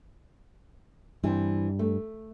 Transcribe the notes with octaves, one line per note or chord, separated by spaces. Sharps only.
G2 E3 C4
A3